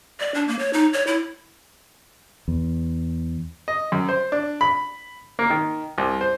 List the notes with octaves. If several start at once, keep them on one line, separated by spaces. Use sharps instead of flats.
D5
D4
A#3
C#5
D#4
C#5
E4
E2
D#5
F#2
C5
D4
B5
A#3
D#3
C2
C5